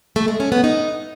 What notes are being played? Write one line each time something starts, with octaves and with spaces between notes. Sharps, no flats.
A3
G#3
C#4
B3
D#4